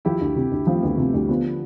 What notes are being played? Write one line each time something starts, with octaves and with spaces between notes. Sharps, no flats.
F3 E4 G4
D2
C3
D2
F3 A3 C4
D2 G3 B3
C3 F3 A3
D2 E3 G3
D3 F3 B3